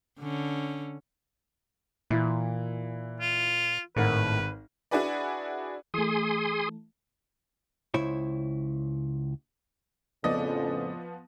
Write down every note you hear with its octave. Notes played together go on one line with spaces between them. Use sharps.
D3 C#4
A#2 E3 E4
F4
G#1 A2 A#4 B4 F#5
D4 E4 F#4 G#4 B4 D5
E3 A3 G#4 C6 D#6
C#2 E4 C5 C#5
F2 A2 C#3 F3 B3 D5 D#5